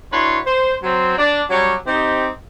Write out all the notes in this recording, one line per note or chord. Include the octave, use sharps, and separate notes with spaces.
D4 E4 F#4 B4 C#5 C6
C5
F#3 C4
D4
F#3 G3 C#4 G4 C#5
C4 D#4 G4